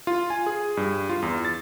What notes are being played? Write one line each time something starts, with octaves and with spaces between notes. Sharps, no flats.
F4
G#5
G#4
G2
F4
E2
A6